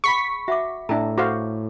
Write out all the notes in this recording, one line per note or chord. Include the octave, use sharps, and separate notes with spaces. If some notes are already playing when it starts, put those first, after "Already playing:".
G#4 F#5 B5 C#6 B6
F#4 E5 F#5 D6
A2 D4 E4 A4 E5 G5 A#5
F#4 A4 C5 F5 D6